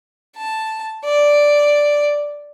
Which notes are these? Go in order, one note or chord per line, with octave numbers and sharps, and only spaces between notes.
A5
D5